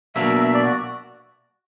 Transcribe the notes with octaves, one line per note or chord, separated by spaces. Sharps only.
B2 F#3 A#3 D4 E5
E5
D5
F#4